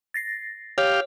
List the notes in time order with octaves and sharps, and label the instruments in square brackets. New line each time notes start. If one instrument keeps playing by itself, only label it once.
[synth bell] A6 A#6 C7
[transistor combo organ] G4 F5 [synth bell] C#5